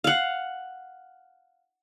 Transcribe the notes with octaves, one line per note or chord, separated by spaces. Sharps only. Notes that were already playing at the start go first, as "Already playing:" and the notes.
F5 F#5